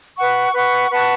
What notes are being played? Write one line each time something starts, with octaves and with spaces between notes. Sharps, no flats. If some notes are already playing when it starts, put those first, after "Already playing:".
B4 F#5 C#6
B4 F#5 C#6
B4 F#5 A5 C#6